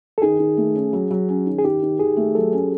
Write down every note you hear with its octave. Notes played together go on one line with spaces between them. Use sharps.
A4
D#3 G#4
D#3
A3
C#4
F#3
F#3
C#4
D#3
G#4
D#3 G4
D#3
D#3 G#4
A3
F#3 A4
C#4